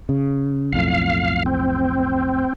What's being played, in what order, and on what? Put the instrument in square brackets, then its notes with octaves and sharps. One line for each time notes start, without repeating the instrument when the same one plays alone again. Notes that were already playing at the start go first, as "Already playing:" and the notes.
[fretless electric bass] C#3
[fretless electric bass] B1 F2 A2 [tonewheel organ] F5
[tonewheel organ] C4